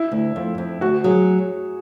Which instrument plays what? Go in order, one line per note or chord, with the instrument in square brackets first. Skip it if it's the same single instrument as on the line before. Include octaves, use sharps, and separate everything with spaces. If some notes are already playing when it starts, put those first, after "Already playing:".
Already playing: [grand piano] E4
[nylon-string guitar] D2
F2
F2
[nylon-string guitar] D2 [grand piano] F#4
[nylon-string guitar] F#3 [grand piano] G#4